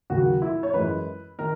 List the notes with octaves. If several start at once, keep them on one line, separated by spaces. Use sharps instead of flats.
D#2 C#3 F#3 F#4
E4
C#5
F#2 E3 G#3 B4
D#3 A#4